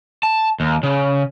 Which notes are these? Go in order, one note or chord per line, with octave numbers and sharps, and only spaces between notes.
A5
D#2
C#3